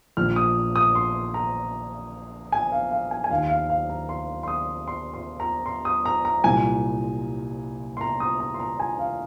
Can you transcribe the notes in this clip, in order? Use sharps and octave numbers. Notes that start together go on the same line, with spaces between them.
A#1 A#2 F6
D#6
D#6
C6
A#5
G#5
F5
F5
G#5
G#5
D#2 D#3 F5
F5
F5
A#5
C6
C6
D#6
C6
C6
A#5
C6
D#6
A#5
A#5
C2 A#2 G#5
C6
A#5
D#6
A#5
C6
A#5
G#5
F5